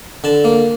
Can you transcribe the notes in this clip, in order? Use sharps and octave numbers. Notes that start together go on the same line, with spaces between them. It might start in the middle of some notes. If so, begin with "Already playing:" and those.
D3 A5
A#3